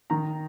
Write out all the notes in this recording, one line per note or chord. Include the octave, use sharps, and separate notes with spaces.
D#3 A#5